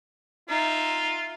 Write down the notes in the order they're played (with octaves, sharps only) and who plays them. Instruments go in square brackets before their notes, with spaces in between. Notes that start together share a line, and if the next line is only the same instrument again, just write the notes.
[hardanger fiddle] D#4 E5 [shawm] F4